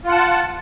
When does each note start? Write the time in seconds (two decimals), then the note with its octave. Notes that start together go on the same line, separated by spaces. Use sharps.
0.04 F4
0.08 F#5
0.12 A5